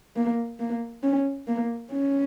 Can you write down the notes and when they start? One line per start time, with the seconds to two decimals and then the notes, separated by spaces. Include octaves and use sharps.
0.16 A#3
0.60 A#3
1.03 C#4
1.48 A#3
1.92 C#4